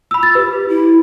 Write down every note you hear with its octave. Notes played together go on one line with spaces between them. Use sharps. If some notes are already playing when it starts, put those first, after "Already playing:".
B5 E6
A6
G4 B4
E4